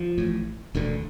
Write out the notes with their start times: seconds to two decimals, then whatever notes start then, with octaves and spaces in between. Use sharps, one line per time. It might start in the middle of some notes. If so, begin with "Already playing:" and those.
Already playing: F3
0.18 A1 A2
0.75 E1 D2 D3